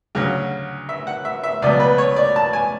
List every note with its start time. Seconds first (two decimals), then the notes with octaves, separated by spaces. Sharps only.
0.15 D2 C#3 F#3
0.89 E5
1.07 F#5
1.25 E5
1.43 E5
1.62 C#2 B2 F#3 D5
1.80 B4
1.98 C#5
2.16 D5
2.36 A5
2.53 G#5